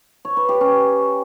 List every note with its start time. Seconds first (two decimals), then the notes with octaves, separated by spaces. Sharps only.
0.25 C#5
0.37 B4
0.49 G4
0.61 C#4